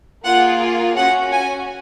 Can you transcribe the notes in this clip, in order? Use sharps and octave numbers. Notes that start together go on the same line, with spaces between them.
A#3 F4 G#4 F#5
C#4 F#4 F#5
G#5